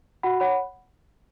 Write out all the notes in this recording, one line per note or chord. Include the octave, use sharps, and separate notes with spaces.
F#4 F#5 B5
C#5 F#5 B5